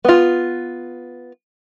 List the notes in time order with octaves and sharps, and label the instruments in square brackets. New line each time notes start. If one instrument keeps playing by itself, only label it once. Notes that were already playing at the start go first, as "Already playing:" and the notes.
[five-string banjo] B3 F4